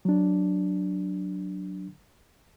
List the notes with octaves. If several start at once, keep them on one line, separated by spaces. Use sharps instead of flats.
F#3 D4